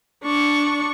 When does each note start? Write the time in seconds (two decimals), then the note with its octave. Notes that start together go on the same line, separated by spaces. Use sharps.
0.24 D4 C#6